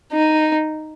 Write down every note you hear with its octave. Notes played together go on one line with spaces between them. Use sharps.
D#4